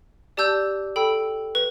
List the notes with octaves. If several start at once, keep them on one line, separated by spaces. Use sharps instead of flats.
G4 D5 A5 E6 G6
A4 G5 B5 E6
B4